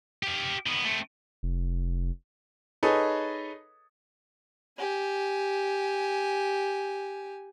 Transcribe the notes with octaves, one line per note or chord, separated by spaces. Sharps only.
G4 F5
D#3 B3
A3 C4
F1
D#4 G#4 A4 B4 C#5 D#5
G4 G#5